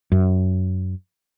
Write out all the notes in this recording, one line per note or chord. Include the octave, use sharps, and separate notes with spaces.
F#2